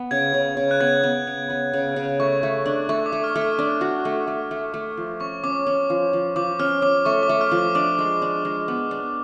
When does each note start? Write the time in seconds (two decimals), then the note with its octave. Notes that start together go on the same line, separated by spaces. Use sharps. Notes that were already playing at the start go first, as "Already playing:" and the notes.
Already playing: B3
0.11 C#3 G#6
0.34 C#3
0.57 C#3
0.71 F#6
0.80 B3 G#6
1.03 B3
1.27 C#3
1.50 B3
1.73 C#3
1.96 C#3
2.20 A3 C#6
2.43 A3
2.66 D4
2.89 A3 C#6
3.06 D6
3.12 A3
3.24 F6
3.35 A3
3.41 F6
3.59 D4
3.81 F#4
4.05 A3
4.28 A3
4.51 A3
4.74 A3
4.97 F3
5.20 C#4 C#6
5.44 C#4 D6
5.67 C#4
5.90 F3
6.13 F3
6.36 F3 D6
6.59 C#4 F6
6.82 C#4 D6
7.05 A3 C#6
7.23 D6
7.29 A3
7.41 F6
7.51 F3
7.58 D6
7.75 D4 D6
7.99 G#3
8.22 D4
8.45 G#3
8.68 B3
8.91 D4